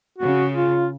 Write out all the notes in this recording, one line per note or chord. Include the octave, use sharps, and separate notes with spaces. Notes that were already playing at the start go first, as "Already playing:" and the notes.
C#3 F#4
F4